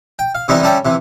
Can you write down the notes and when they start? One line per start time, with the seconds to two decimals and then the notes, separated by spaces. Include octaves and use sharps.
0.19 G5
0.35 F5
0.48 C3 E3 G3 B3 D#4 E4
0.63 G3 C#4 A4 D5 E5 G5
0.85 C3 E3